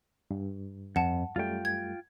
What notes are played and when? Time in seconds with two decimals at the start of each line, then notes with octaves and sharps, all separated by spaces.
0.31 G2
0.96 F2 F#5 A5
1.36 F#2 G3 A3 F4 G5
1.65 G#6